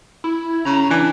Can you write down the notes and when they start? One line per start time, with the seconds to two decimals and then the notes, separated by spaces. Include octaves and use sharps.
0.24 E4
0.65 C#3 A#5
0.90 E3 D4